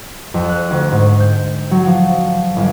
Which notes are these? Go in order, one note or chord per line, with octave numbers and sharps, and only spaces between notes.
F2
F#6
D2
G#2
G6
F#3
F3
G1